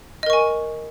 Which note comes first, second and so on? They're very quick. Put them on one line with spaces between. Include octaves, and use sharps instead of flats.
D#5 A#4 C#6 G#5